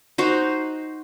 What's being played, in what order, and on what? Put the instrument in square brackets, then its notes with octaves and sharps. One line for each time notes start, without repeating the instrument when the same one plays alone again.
[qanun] D#4 F#4 C5